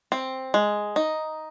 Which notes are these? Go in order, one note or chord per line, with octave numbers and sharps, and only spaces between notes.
C4
G#3
D#4